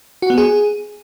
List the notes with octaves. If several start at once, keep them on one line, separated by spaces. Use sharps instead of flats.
F#4
B3
G#4